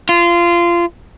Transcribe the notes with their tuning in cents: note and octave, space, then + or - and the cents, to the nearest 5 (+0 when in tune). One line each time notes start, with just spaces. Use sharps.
F4 -20